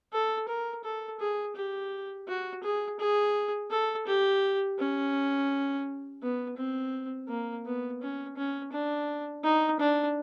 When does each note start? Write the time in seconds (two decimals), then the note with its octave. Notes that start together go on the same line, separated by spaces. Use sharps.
0.13 A4
0.48 A#4
0.84 A4
1.20 G#4
1.56 G4
2.28 F#4
2.63 G#4
2.99 G#4
3.70 A4
4.07 G4
4.79 C#4
6.22 B3
6.57 C4
7.28 A#3
7.65 B3
8.01 C#4
8.37 C#4
8.72 D4
9.44 D#4
9.80 D4